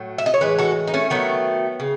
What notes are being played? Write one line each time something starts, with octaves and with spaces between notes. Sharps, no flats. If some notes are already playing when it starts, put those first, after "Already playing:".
Already playing: A2 F#3 A3
E5
D#5
C#5
A2 E3 G#3 B4
F#4 A4
D#4
A3 C#4
D#3 F#3 A3 B3
C#3